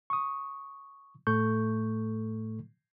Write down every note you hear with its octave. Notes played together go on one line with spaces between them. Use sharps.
C#6 D#6
A2 A3 A4 C#6 G6